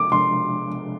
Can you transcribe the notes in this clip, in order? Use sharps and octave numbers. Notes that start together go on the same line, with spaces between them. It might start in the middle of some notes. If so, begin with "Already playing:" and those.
Already playing: C3 F3 G#3 D4 D6
C3 F3 G#3 D4 C6